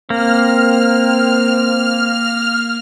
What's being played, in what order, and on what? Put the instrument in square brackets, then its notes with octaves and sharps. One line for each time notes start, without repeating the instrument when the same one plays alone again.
[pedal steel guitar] A#3 [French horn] C4 [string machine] F6